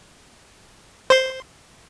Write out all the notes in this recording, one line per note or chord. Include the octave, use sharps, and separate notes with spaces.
C5 C6